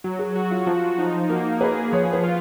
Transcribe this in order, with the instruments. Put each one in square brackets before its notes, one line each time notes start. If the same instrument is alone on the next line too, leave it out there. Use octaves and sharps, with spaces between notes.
[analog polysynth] F#3 [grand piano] F#4
[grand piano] G#4
[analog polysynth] F#4
[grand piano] F4
[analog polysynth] F3 [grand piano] F4
[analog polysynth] D#4
[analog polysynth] A#3 [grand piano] F#4
[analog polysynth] G#4 [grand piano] B4
[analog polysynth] F3 [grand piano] C#5
[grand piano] B4
[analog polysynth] F4